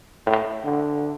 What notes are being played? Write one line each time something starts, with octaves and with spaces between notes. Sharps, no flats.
A2
D3